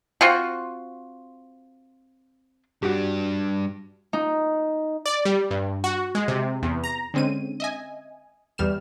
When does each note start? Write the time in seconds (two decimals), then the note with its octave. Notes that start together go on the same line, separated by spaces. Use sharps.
0.21 C4 F4 F#4
2.83 G2 D4 F#4 G4
4.13 D#4
5.06 D5
5.25 G3
5.51 G2
5.84 F#4
6.15 G#3
6.28 C3
6.63 E2
6.84 A#5
7.14 D3 G#3 C4 C#4 D#7
7.60 D#5 E5 G#5
8.58 E2 G3 F6 E7